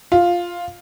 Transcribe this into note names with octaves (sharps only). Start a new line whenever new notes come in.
F4